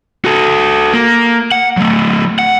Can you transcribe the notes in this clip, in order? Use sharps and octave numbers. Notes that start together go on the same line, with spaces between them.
F#4 A4
A#3
F#5
F#3 A3
F#5